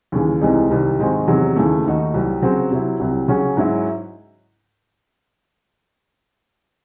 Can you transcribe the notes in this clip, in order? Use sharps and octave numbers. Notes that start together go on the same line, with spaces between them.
D#2 C#3 E3
C2 C3 E3 G#3 D#4
C2 C3 D#3
G#2 D#3 G#3 C4 F#4
E2 C3 D#3 F#3
D#2 C#3 E3 A3
D#2 D#3 A3 D#4 F#4
C2 C3 F#3
C#3 F#3 C4 F#4
C3 F#3 C4 E4
C2 C3 F#3
C#3 F#3 C#4 F#4
G#2 F#3 C#4 E4